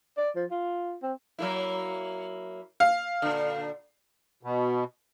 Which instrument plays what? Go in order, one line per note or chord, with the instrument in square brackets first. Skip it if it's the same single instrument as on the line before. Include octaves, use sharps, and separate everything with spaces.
[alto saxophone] D5
F3
F4
C4
[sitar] F#3 A#3 E4
[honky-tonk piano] F5
[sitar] A#2 D3
[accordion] B2